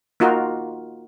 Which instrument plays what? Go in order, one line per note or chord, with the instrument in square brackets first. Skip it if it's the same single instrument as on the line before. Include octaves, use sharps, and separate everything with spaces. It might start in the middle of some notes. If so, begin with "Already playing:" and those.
[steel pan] A#3 D#4 F4 F#4 A#4